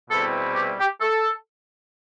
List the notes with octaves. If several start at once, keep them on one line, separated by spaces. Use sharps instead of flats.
E2 B2 G3 C4 E4 A4
G4
G4
A4